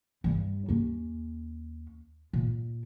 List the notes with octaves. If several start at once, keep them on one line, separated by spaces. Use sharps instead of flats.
G2 G3
D#2 C#4
A#2